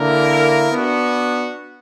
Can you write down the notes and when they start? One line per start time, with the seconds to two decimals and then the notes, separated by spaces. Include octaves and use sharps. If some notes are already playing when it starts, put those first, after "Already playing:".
Already playing: D3 A#3 E4 A#4
0.72 B3 D4 F#4